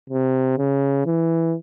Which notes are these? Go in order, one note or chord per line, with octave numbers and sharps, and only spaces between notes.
C3
C#3
E3